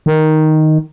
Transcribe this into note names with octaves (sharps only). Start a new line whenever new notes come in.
D#3